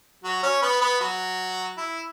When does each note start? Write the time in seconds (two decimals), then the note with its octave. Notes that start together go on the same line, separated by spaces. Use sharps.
0.24 F#3 F#4
0.43 C#4 C#5
0.62 B3 B4
0.81 B3 B4
1.00 F#3 F#4
1.77 E4